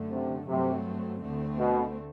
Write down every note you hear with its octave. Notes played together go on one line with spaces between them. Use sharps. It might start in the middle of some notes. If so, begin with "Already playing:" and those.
Already playing: F#2 D3 A3
C3
G2 C3 F#3 A3 C4
D2 D3 A3 C4
B2